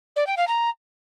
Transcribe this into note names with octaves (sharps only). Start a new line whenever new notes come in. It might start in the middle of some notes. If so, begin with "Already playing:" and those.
D5
G5
F5
A#5